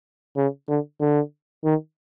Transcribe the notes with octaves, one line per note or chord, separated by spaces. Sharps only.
C#3
D3
D3
D#3